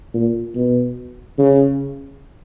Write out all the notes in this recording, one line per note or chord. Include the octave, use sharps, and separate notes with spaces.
A#2
B2
C#3